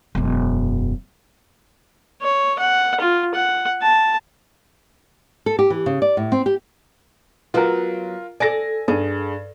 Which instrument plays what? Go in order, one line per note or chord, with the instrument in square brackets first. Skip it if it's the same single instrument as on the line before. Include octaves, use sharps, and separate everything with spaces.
[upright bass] E1 F#2
[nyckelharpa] C#5
F#5
F4
F#5
A5
[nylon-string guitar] A4
G4
E3
C#3
D5
A2
C4
G4
[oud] F#3 B3 [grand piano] F4 A#4
[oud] A4 D5 [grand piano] G#5 A#6
[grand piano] G2 [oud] G#4